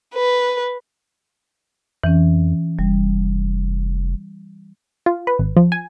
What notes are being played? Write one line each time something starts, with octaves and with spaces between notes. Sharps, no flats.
B4
F2 E3 C#4
F1 G3
F4
B4
G#1
F3
G#5